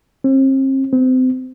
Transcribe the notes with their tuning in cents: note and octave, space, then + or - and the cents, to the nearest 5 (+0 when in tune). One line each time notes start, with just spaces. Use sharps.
C4 +40
C4 -30